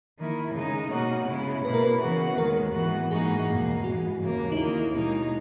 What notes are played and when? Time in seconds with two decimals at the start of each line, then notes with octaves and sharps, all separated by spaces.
0.18 D#3 A#3 E4
0.54 C#3 G#3 D#4
0.91 B2 A#3 D#4 F#4 C#5
1.27 C#3 G#3 B3 E4
1.64 B2 A#3 E4 B4
1.74 A#4
1.84 B4
2.00 C#3 E3 B3 F#4
2.38 D#2 D#3 G#3 A#4
2.74 G#2 E3 B3 F#4
3.11 G#2 E3 A#3 D#4 F#4 G#4
3.48 E2 B2 A#3
3.83 G#2 E3 G#3 F#4
4.21 D#2 C#3 E3 A#3
4.52 D#4
4.57 D#2 D#3 A#3 E4
4.93 B2 G#3 D#4